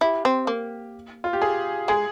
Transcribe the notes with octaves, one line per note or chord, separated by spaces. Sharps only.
E4 G4
C4
A#3
F4
G4
G#4
G#3 G#4